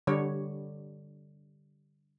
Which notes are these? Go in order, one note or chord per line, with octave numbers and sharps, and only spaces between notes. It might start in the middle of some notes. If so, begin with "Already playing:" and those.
D3 G3 C#5